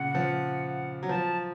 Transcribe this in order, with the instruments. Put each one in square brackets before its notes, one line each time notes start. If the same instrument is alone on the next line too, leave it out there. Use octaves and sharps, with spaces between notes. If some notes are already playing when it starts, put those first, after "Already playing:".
Already playing: [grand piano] A#2 C#3 [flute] F#5
[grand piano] F3
F#3
[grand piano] F3 [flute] A5